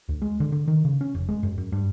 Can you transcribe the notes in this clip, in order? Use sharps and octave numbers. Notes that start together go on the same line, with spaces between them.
D2
G#3
D3
D3
D#3
C#3
C#4
F1
G#3
F#2
F#2
G2